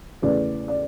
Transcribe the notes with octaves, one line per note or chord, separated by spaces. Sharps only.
E2 C#3 E3 A3 D5
D5